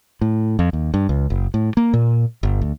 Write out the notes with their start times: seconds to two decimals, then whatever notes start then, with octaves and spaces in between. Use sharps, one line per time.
0.21 A2
0.59 F2
0.73 D#2
0.94 G2
1.09 C#2
1.30 F#1
1.54 A2
1.77 A#3
1.93 A#2
2.43 G1
2.61 D2